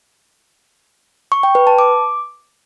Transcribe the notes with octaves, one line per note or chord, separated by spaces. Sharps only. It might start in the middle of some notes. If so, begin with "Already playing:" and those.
C#6
G5
B4
A5
D6